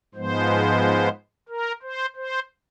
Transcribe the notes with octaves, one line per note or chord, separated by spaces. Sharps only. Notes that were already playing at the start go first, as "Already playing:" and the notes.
G#2 F3 G#3 B3 C5
A#4
C5
C5